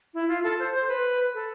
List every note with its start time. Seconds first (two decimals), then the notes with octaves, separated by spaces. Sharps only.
0.14 E4
0.29 F4
0.43 A4
0.59 C5
0.74 C5
0.88 B4
1.34 A4